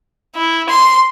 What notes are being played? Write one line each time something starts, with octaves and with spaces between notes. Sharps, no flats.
E4
C6